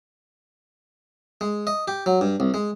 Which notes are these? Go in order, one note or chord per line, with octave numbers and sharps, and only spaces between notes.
G#3
D#5
G4
F#3
G2
C2
G#3